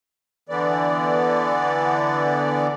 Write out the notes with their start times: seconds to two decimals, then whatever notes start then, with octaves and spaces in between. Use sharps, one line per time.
0.49 D3 E3 B3 D5